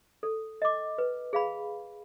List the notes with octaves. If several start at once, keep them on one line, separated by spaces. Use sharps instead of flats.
A4
D#5 D6
B4
G#4 F5 B5